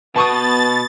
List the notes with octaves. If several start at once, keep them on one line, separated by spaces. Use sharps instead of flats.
B2 B3 A5 C#6 D#6 A6